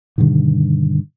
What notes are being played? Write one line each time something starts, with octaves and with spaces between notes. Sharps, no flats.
G2 B2 D3 D#3